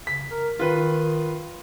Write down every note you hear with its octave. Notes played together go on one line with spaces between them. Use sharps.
C#3 B6
A#4
D#3 F4 B4